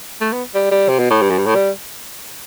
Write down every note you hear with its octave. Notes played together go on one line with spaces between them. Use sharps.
A3
B3
G3
G3
C3
B2
A2
G2
F#2
G2
A2
G3